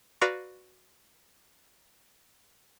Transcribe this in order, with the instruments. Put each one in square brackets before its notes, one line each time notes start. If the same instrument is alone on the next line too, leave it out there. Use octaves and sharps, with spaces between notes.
[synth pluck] F#4 B4 D5 F5 A#5 C#6